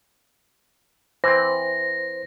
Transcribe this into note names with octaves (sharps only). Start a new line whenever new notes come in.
E3 C4 C5 A#6